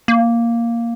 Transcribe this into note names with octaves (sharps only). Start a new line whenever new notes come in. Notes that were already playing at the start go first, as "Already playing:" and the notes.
A#3